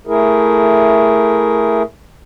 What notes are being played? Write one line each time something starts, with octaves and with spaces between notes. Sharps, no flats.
A3 E4 G#4 A#4